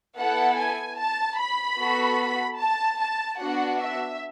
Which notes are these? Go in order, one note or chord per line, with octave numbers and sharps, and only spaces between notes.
B3 E4 A4 F#5
G#5
A5
B5
B3 F#4 A4
A5
A5
B3 D4 F#4 F#5
E5